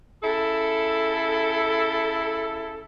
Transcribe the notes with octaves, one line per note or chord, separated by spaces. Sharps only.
C#3 E4 A4